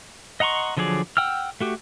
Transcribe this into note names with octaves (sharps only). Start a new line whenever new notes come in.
D#5 F#5 A#5 C6 C#6
D3 F3 F#3 G#4 D5
F#5 G5 E6 F6
A3 F#4 G4